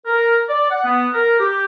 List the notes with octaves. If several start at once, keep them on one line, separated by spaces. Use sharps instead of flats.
A#4
D5
F#5
B3
A#4
G4